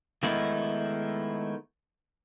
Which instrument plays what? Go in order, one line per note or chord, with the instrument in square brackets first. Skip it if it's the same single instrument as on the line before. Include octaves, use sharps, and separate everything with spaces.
[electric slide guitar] D#3 G#3 A3 B3 D#4 E4